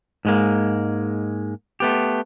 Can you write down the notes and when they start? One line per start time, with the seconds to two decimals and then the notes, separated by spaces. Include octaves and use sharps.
0.25 G#2 G#3 A#3
1.80 A3 B3 G4